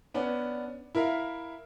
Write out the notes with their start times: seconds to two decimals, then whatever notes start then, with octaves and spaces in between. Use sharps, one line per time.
0.14 B3 C#4 D4
0.95 E4 A#4 E5 F5